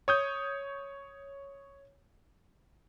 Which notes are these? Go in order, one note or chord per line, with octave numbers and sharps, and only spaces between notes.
C#5 D#6 G6